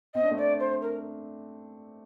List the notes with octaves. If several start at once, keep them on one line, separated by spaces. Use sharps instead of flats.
C4 D#5
D4
A3 C4
D5
C5
A#4